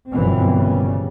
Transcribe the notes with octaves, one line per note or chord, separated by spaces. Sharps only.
G1 F#2 B2 E3 C4
C#3 G3